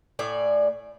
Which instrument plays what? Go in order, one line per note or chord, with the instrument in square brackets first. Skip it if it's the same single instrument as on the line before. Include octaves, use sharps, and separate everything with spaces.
[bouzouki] A2 D5 G#5